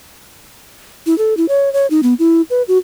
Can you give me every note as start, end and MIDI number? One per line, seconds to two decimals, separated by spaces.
1.06 1.17 64
1.18 1.34 69
1.37 1.46 64
1.49 1.72 73
1.73 1.87 73
1.91 2.01 63
2.03 2.14 59
2.19 2.42 64
2.50 2.62 71
2.68 2.78 66